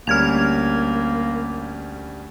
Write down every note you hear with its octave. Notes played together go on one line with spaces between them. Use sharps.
D2 G3 A#3 C#4 F6 G#6 F7